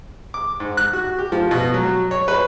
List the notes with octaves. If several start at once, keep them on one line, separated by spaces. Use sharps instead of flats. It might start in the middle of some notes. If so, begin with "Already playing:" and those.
D6
G#2
F#6
F#4
G4
F3
B2
F#3
C#5
B4